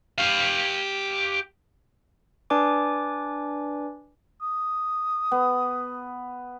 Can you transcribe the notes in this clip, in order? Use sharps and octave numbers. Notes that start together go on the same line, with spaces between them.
G4 F5
D4 B4 D5 G#5 D6
D#6
B3